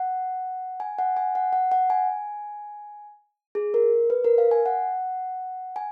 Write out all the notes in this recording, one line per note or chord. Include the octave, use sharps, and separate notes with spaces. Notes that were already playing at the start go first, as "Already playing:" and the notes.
Already playing: F#5
G#5
F#5
G#5
F#5
F#5
F#5
G#5
G#4
A#4
B4
A#4
F5
G#5
F#5
G#5